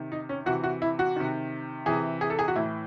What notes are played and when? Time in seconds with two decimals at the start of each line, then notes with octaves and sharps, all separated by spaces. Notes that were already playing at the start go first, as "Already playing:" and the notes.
Already playing: C3 D#3
0.12 D#4
0.29 C#4
0.46 C3 E3 F#4
0.64 F#4
0.82 E4
0.99 F#4
1.16 C3 D#3
1.86 C3 E3 G#4
2.21 G#4
2.30 A4
2.39 G#4
2.48 F#4
2.56 A2 E3 E4